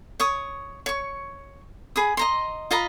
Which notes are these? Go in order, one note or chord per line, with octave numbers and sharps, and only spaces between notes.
C#5 C#6 D#6
C#5 C#6
G#4 B5 D#6
D#5 A#5 C6
F4 D#5 A#5 B5